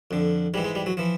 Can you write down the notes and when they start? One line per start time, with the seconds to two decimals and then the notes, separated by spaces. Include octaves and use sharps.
0.11 F2 D3
0.54 G#2 G3
0.58 E3
0.64 G#3
0.75 G3
0.86 F#3
0.97 E3 F3